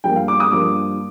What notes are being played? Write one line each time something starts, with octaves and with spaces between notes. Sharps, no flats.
G2 F3 A#3 G5
F5
D6
D#6
G2 F3 A#3 D6